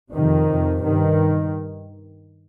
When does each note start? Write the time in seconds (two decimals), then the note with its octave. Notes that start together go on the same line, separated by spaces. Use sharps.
0.12 F2 C3 D#3
0.48 F2 C3
0.84 G2 D#3